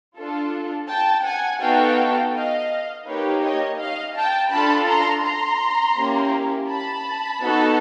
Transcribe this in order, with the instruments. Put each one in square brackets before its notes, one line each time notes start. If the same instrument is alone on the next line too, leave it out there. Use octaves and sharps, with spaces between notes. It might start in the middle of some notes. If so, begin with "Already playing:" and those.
[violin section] D4 F4 A4
G5 A5
F#5 G#5
B3 D#4 F#4 A4 F5 G5
D#5 F5
A#3 D#4 G4 B4 C#5
C#5 D#5
D#5 F5
G5 A5
D4 F4 A4 A5 B5
A#5 C6
A#5 C6
A#3 C#4 E4 G4
A5 B5
B3 D#4 F#4 A4